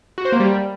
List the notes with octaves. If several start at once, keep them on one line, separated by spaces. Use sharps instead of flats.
F#4
C5
A#3
G3